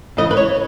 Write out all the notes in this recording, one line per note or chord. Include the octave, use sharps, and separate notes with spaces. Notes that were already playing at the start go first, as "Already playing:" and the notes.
C#3 E3 G#3 D#5
B4
C#5